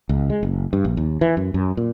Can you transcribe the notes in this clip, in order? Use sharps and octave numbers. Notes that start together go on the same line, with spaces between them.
C#2
G#3
F#1
G2
A#1
D#2
E3
F#2
F#2
A#2